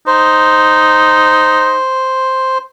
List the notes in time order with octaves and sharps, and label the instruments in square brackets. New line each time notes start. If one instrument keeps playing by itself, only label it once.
[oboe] D#4 [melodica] C5